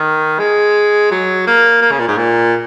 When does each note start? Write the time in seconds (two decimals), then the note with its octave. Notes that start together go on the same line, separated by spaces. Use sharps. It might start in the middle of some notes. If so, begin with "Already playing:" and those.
Already playing: D#3
0.40 G#3
1.11 F#3
1.47 A#3
1.82 A#3
1.92 C#3
1.99 A#2
2.08 G#2
2.17 A#2